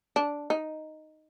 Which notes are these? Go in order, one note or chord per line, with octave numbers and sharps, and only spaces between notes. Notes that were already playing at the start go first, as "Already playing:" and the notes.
D4
D#4